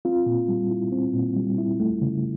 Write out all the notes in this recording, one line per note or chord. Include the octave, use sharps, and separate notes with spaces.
C4 F4
A#2
G3
E4
C4
A#2
G3
E4
A3
C#3